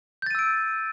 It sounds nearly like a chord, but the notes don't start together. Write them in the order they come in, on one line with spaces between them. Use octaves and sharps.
G6 A6 D#7 E6 D7